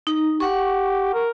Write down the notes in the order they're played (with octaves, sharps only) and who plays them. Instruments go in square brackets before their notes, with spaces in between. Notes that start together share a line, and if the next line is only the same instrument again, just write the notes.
[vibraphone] D#4
[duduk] G4 [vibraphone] F#5 C#6
[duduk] A#4